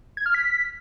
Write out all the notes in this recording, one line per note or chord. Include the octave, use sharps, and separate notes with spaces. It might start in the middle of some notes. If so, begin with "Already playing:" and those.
G#6
F6
B6